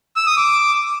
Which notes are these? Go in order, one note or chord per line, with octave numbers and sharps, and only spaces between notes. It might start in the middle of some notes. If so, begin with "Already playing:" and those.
E6
D#6
D6